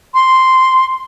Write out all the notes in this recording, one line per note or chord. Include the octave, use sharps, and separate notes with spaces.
C6